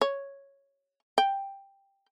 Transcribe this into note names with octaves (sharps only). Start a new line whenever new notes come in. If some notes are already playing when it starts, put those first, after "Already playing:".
C#5
G5